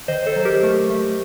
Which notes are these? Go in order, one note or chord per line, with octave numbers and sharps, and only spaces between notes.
D#3 C5 D#5
A4 C5
F#3
G4 A#4
A3
A3